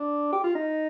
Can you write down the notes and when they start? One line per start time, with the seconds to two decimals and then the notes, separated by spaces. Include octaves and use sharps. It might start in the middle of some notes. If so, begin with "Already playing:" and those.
Already playing: D4
0.32 G4
0.44 F4
0.55 D#4